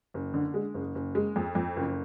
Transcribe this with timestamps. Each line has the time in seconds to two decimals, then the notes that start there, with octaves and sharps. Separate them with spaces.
0.14 F#1
0.34 D3
0.54 G#3
0.74 F#1
0.95 F#1
1.15 G#3
1.36 F2
1.55 F2
1.76 F#1